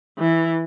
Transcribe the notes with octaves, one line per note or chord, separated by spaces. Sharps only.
E3